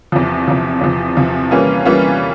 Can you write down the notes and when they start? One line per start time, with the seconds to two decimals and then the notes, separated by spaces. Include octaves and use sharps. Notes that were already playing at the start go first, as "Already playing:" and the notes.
0.12 E2 C3 F3
0.48 E2 C3 F3
0.81 E2 C3 F3
1.17 E2 C3 F3
1.51 E3 G3 A#3 C#4 F4
1.85 E3 G3 A#3 C#4 F4